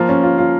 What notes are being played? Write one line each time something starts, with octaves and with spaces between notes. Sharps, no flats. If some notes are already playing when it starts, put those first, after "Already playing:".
Already playing: F3 A#3 F4
C#4
F4
F4